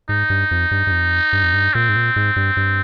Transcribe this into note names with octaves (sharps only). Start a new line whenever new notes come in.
G#2 D#4
G2
F2
G2
G2
F2
G2
F2
G2
A#2 C4
G#2
A#2
G#2
G2
G2